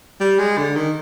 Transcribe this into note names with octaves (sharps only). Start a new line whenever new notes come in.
G3
G#3
D3
D#3